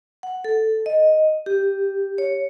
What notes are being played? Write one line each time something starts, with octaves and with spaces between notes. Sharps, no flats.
F#5
A4
D#5
G4
C#5